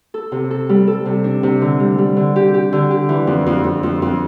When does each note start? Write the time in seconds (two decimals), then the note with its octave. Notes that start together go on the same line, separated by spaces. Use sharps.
0.14 A4
0.32 C3
0.51 A4
0.69 G3
0.87 A4
1.06 C3
1.24 D4
1.43 C3
1.62 D3
1.80 G3
1.98 G3
2.17 D3
2.36 G4
2.54 G4
2.73 D3
2.91 G4
3.09 E3
3.27 F2
3.46 F2
3.64 F2
3.83 F2
4.02 F2